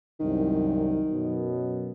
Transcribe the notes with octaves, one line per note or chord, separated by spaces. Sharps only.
C2 F#2 D#3
F#2 B2